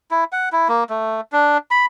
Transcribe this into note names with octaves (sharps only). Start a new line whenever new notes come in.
E4
F#5
E4
A#3
A3
D4
B5